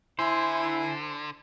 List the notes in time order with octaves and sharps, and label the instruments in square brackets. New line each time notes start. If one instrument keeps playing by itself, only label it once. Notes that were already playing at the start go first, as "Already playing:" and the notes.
[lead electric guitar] D3 [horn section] E4 [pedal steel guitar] C5 [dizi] G#5